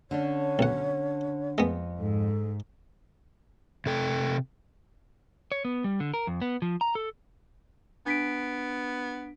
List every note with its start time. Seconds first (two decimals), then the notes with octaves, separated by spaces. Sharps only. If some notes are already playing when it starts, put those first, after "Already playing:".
0.11 D3 C#4 D4 C#5
0.59 B1 F#5
1.58 F2 G#3 B3
1.98 G#2 A4
3.86 C3 A4 G5
5.52 C#5
5.65 B3
5.84 G3
6.00 D3
6.14 A#4
6.27 F2
6.42 B3
6.62 F3
6.81 A#5
6.95 A4
8.06 B3 D4 B6 D7